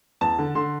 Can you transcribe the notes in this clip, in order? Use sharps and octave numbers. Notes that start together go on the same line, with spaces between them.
E2 A5
D3
D3 C6